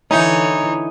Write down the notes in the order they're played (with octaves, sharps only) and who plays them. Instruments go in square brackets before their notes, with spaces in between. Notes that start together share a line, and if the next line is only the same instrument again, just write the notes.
[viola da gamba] D3 E3 [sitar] D#4 [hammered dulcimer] E4 A#4 G#5 [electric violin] C#5